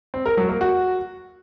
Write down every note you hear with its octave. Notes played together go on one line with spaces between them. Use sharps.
C4
A#4
F#3
A#3
F#4